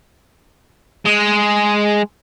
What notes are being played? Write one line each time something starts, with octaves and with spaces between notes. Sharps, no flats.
G#3